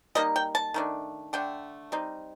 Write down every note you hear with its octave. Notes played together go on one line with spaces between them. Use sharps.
G3 A#3 D#4 D#5
G5
A5
D#3 A3 D4
D3 A3 D4 G5
G3 C4 D#4